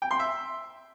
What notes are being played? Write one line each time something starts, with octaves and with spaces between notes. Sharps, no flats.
G5
C6
E5